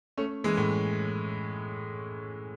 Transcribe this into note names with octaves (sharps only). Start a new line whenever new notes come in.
A3 C#4
E3 G#3
A2